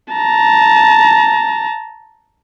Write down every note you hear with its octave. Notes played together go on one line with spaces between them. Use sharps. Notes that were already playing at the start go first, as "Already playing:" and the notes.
A5 A#5